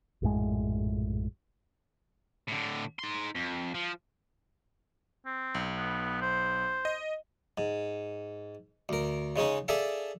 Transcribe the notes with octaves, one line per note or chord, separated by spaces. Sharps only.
A#1 F#2 A2 G#3
A2 D3
D#4 C6
F2
F3
C4
B1
B3
C5
D#5
G#2
D2 A#4
C#3 G#3 C#4 D#4
D4 G#4 A4 E5 F5